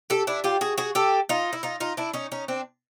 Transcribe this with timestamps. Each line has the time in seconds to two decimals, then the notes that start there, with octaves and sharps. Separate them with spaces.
0.10 G4 A4
0.27 D4 E4
0.44 F4 G4
0.61 F#4 G#4
0.78 F#4 G#4
0.95 G4 A4
1.29 D#4 F4
1.53 E4
1.63 D#4 F4
1.80 D#4 F4
1.97 D4 E4
2.14 C#4 D#4
2.32 C#4 D#4
2.48 C4 D4